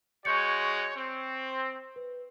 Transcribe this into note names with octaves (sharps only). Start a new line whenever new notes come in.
G#3 F#4 C#5 C#6 G6 C#7
C4
B4